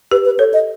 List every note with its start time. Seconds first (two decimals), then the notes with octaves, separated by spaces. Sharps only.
0.11 G4 B4
0.25 B4
0.39 A4 C#5
0.53 D#5